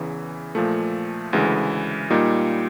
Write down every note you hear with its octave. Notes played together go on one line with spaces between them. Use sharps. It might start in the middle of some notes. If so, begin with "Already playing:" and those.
Already playing: E2 C#3 E3
A#2 F3 A3
D2 C#3 E3 G#3
A#2 G3 A#3 D#4